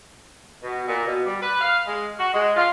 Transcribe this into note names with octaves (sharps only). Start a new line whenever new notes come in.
B2
A#2
B2
G3
B4
F5
G#3
F#4
G#3
F4